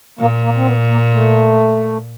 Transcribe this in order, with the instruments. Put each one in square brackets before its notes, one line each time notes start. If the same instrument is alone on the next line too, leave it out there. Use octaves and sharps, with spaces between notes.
[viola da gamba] A#2 [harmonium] A#3
[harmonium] A#3
C4
B3
A#3
A3